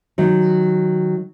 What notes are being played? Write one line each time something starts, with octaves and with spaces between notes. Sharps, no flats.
D#3 F#3